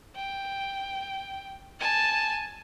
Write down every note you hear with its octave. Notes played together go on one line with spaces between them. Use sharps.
G5
G#5 A5